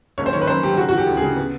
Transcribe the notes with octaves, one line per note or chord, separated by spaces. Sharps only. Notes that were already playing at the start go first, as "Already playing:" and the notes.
F#1 C#5
C5
D#3 C#5
B4
F#2 C5
F#3 G4
C#3 F#4
E3 F#4
G4
D2
G#4
C#3
B3